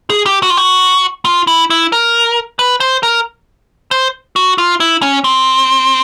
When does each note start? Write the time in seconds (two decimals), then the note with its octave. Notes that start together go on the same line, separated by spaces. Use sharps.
0.10 G#4
0.26 G4
0.43 F#4
0.50 F4
0.57 F#4
1.25 F4
1.47 E4
1.70 E4
1.92 A#4
2.59 B4
2.80 C5
3.03 A#4
3.91 C5
4.36 F#4
4.58 F4
4.80 E4
5.02 C#4
5.24 C4